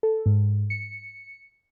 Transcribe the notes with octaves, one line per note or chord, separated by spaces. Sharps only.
A4
G#2
C#7